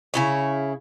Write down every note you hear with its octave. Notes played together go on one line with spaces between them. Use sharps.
C#3 E4 C#5